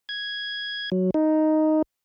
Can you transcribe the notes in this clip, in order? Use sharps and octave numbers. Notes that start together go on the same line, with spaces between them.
G#6
F#3
D#4